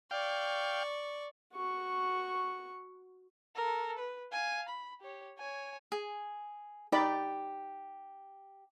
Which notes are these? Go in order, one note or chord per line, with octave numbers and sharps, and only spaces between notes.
D5 F5 G5 C#6
F#4 C#6
A4 A#4
B4
F5 G#5
B5
G4 C#5
C#5 G#5
G#4
D#4 G4 D5 B5